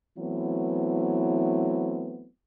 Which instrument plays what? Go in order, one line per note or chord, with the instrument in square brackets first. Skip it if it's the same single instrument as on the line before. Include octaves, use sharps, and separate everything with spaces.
[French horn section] E3 F#3 A3 B3 C4 E4